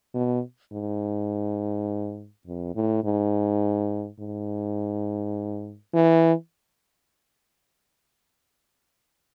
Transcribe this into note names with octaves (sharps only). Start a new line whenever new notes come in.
B2
G#2
F2
A2
G#2
G#2
E3